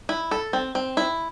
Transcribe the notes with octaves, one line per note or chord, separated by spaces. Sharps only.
E4
A4
C4
C4
E4